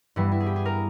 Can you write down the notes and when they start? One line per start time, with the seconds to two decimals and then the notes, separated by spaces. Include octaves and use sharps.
0.16 G2 E3 G3 B3 E4
0.32 E4
0.40 G#4
0.46 G4
0.56 G#4
0.66 A#4